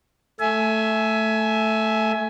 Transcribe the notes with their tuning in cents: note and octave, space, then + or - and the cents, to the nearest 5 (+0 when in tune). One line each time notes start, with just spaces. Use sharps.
A3 +0 E5 +0 G#5 +20